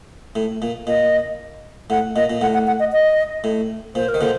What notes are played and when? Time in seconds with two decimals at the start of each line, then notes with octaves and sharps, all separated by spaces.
0.36 A2
0.62 A#2
0.87 A#2 D#5
1.90 A2 F#5
2.16 A#2 D#5
2.30 A#2
2.41 A2 F#5
2.54 F#5
2.67 F#5
2.79 D#5
2.92 D#5
3.44 A2
3.95 A#2 C5
4.09 A#4
4.14 D#3
4.21 A#2 D3 C5